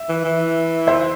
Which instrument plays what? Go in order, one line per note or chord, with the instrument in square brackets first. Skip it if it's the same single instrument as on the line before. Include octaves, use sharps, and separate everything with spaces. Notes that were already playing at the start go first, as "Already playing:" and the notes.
Already playing: [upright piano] E5
[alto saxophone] E3
E3
[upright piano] C5 E5